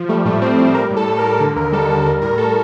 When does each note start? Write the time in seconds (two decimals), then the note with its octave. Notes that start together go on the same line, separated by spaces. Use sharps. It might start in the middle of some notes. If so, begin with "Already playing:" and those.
Already playing: F3
0.09 G3 A3
0.25 A2 A3
0.41 A2 C4
0.58 G3 C4
0.74 G3 A#4
0.91 A2
0.97 A4
1.08 A2
1.19 A#4
1.23 G3
1.40 D3 A4
1.56 D#2 A#4
1.72 G3 A4
1.89 D#2 A4
2.06 G3 A#4
2.22 A2 A#4
2.38 A2 A4